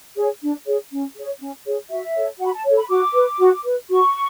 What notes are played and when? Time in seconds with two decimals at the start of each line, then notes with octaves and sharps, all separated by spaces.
0.16 G#4 C#5
0.41 D4
0.66 G#4 C#5
0.91 C#4
1.15 G#4 C#5
1.40 C#4
1.65 G#4 C#5
1.90 F#4 E5
2.16 A4 C#5
2.39 F#4 F#5
2.46 B5
2.53 A5
2.64 A4 C#5
2.77 B5
2.89 F#4 D6
3.14 B4
3.39 F#4
3.65 B4
3.89 F#4 C#6